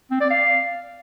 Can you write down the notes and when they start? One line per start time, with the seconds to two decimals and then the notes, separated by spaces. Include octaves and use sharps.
0.11 C4
0.21 D5
0.30 F5